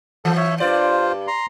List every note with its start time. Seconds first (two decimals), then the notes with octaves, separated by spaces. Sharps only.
0.25 E3 A4
0.37 C#5 E5
0.60 G2 F4 C5 D5
1.27 A#5 C6